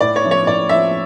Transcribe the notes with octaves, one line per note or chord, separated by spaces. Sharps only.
A2 D5
C#5
F3 C#4 E4
C#5
A2 D5
F3 C#4 E4 E5